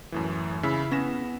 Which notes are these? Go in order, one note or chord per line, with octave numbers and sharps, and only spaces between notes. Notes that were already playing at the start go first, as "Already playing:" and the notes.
F#2 A2 E3
C#3 E4
B3 C#4 A#6 E7